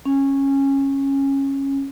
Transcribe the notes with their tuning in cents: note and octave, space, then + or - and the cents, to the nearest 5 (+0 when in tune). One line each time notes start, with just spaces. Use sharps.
C#4 -15